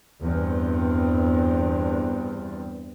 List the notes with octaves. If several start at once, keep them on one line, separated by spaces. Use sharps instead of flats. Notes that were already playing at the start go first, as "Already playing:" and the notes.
E2 G2 C4